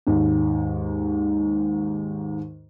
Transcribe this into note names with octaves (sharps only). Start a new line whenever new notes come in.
D#2 G#2